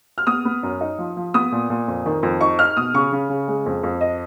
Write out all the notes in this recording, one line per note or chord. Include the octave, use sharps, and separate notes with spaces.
F6
B3 D#6
B3
F#2
D#4
F3
F3
B3 D#6
A#2
A#2
F2
D#3
F2
D#4 C#6
D#4 F6
B2 D#6
C#3 C#6
C#3
C#3
G#3
F2
F2
D#5